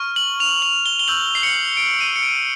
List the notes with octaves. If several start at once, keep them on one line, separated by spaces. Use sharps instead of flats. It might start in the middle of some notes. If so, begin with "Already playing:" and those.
Already playing: C#6 F6
F#7
F7
F#7
G7
G7
C#6 E6 G6 F#7
C7
C#7
D7
D#7
C#7
D7